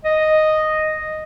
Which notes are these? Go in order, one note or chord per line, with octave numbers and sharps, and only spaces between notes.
D#5